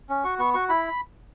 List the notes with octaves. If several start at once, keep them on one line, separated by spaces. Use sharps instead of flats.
C#4
F#4 C#6
B3 C#6
F#4 C#6
E4 B5